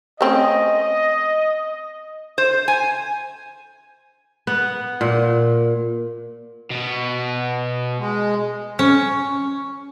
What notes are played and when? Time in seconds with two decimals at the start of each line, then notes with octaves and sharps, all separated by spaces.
0.21 A3 C4 C#4 D#5
2.38 C5
2.68 G#5
4.47 B3
5.01 A#2
6.70 B2 B3
7.99 G#3
8.79 C#4